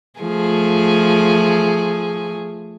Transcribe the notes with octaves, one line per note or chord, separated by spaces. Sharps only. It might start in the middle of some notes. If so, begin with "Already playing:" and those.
F3 A3 G#4